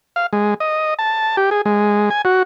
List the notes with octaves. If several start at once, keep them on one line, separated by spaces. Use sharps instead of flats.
F5
G#3
D#5
A5
G4
G#4
G#3
G#5
F#4